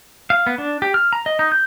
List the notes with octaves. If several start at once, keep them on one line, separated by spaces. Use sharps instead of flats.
F5
B3
D4
G4
F6
A#5
D#5
D#4
G6